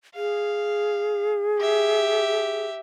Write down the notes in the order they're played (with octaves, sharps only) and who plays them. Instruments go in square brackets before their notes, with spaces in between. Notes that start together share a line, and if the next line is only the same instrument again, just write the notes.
[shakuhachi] G#4 [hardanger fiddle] F5
[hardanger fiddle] G4 E5